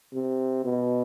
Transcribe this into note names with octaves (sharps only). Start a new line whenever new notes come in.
C3
B2